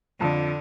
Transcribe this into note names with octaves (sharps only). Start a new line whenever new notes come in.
F2 D3